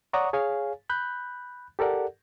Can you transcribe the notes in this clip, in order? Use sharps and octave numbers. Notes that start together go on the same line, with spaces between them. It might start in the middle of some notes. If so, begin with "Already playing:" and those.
C#5 D5 F#5 A#5 C#6 D#6
G#4 C#5 F5 G#5
B5 F#6 G6
G4 A4 A#4 D5 F#5